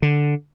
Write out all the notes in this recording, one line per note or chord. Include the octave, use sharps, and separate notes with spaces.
D3